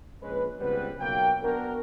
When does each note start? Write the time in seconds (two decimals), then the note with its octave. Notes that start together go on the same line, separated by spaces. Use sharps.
0.22 A#1 G#3 C#4 B4
0.59 C#2 G3 B3 C4 B4
0.99 B1 F#3 A#3 G5
1.42 B3 D4 F#4 A#4